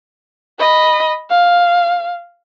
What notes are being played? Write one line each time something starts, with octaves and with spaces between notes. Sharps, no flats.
D#5 B5
F5